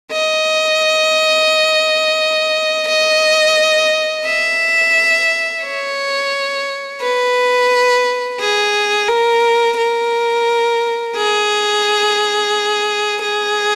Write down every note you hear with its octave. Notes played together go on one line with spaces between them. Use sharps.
D#5
D#5
E5
C#5
B4
G#4
A#4
A#4
G#4
G#4